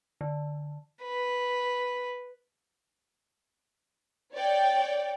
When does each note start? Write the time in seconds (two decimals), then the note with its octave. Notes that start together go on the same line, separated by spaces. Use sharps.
0.21 D3
1.03 B4
4.33 C#5 D5 G5